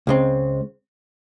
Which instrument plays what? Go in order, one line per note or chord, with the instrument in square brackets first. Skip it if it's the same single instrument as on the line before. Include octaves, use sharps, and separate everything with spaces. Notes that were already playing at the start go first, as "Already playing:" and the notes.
[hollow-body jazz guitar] C#2 C#3 G#3 C4